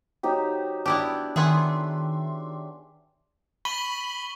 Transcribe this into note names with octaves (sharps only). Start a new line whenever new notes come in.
F#3 D#4 G4
B3 D4 E4 G4 D5
D#3 B3 G#4 E5 C6
B5 C#6 F#7 G7